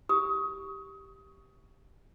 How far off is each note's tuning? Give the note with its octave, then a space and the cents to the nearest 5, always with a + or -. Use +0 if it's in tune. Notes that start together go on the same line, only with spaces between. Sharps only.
G4 +0 D#6 +25